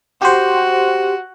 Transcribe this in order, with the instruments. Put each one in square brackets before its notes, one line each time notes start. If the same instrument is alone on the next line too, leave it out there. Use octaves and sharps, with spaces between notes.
[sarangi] F#4 [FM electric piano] G4 C5